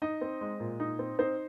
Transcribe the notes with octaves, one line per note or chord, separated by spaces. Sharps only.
D#4 D#5
C4
G#3
A#2
D#4
C4
C4 D#4 C5